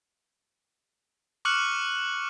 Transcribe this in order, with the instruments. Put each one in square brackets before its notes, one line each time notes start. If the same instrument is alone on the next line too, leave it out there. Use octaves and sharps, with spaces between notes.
[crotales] C#6 D6 F6 F#6 C#7 F#7